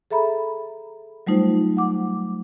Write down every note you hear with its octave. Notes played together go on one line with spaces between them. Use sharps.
G#4 A4 E5 A#5 B5
F#3 G3 A3 D#4 F4 C5
F#5 D6